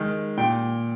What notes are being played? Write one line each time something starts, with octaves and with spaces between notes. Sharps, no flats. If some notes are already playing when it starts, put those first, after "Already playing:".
Already playing: D#3 G#3
A#2 G5